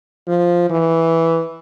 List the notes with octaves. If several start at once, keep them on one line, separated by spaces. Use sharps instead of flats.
F3
E3